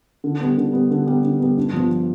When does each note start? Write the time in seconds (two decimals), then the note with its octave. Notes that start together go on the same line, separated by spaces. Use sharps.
0.24 D3
0.41 G3 B3
0.57 D3
0.73 G3 B3
0.90 D3
1.07 G3 B3
1.24 D3
1.40 G3 B3
1.58 G2
1.73 F3 B3